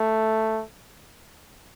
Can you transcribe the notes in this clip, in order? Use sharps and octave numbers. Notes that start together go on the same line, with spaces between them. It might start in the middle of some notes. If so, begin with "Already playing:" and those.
Already playing: A3